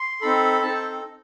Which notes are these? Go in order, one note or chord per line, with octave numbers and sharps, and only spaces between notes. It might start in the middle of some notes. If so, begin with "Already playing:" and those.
Already playing: C6
C4 D#4 A4 B5
C4 D#4 A4 A5
G5